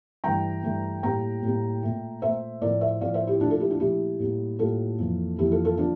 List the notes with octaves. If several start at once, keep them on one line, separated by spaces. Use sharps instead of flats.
G2 E3 A3 G5 A#5
G2 E3 A3
A2 G3 A#3 G5 A#5
A2 G3 A#3
A#2 A3
A#2 A3 C5 E5
A2 F3 A3 A#4 D5
C5 E5
A2 F3 A3 D5 F5
C5 E5
E4 G4
A#2 F3 A3 D4 F4
F4 A4
E4 G4
D4 F4
A#2 F3 A3 E4 G4
A2 G3 A#3
A2 G3 A#3 F4 A4
F2 E3 A#3
F2 E3 A#3 E4 G4
F4 A4
F4 A4
F3 A#3 D4 F4